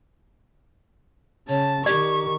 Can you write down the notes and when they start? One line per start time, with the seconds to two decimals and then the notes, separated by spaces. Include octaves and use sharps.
1.48 C#3 C#5 A5
1.86 D#3 G4 D5 C#6